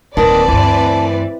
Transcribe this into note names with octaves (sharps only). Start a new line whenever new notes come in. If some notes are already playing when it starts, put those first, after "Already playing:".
D1 D#3 A#3 C4 B4 D5 A5
D2 G2 E3